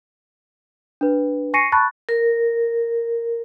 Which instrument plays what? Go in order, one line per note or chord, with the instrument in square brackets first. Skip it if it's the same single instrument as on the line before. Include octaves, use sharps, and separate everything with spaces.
[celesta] D4 B4
G#5 C#6 A#6 C7 C#7 D#7
A5 B5 C#6 F#6 A6
[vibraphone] A#4